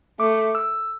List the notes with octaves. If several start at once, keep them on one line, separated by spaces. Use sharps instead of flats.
A3 D6
E6